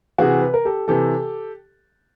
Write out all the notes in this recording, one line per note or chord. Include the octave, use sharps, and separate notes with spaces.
C3 E3 F#4 G#4
B4
A#4
G4 A4
C3 E3 G4 A4